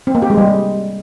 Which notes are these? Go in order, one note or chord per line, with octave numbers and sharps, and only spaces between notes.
C4
A#3
G4
G#3
G3